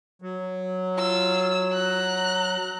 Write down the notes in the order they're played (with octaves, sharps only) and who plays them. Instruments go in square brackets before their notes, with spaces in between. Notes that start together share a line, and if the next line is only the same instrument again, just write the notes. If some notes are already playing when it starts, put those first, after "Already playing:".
[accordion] F#3
[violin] F4 E6
A#5 F#6